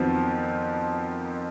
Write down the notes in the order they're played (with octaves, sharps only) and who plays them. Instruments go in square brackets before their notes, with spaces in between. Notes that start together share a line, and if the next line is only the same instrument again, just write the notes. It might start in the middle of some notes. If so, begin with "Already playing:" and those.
Already playing: [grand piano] F2 F3 [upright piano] D#3 F#3 B3 D#4